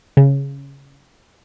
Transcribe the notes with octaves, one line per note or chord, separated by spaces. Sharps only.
C#3